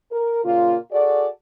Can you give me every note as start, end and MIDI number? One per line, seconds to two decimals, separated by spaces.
0.11 0.44 70
0.44 0.76 46
0.44 0.76 49
0.44 0.76 58
0.44 0.76 65
0.92 1.28 66
0.92 1.28 68
0.92 1.28 69
0.92 1.28 74